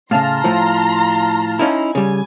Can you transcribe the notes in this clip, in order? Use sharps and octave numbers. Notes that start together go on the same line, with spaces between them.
A2 C#3 F5 A5 A#5 C6 F6
A2 F3
C#4 D#4 E4
C#3 G3 G#5